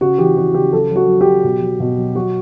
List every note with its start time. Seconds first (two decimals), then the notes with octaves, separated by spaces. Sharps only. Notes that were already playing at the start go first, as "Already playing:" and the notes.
0.01 C#3 F#4
0.18 E3 G4
0.37 E3 F#4
0.54 C#3 G4
0.73 F#3 A4
0.90 F#3
0.96 F#4
1.08 F#3
1.21 G4
1.26 F#3
1.44 B2
1.62 F#3
1.80 B2
1.98 F#3
2.15 F#3 F#4